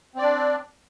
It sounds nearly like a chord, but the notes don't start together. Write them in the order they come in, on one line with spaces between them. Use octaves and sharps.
C4 D5 D4